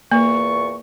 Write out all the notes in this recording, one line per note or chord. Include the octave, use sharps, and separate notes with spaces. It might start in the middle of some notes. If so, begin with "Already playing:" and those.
E2 A#2 A#3 C#6